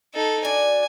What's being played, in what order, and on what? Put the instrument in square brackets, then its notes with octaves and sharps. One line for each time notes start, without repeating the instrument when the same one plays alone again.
[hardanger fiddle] D#4 A4
[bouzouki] D4 F#4 D5 [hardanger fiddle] G#5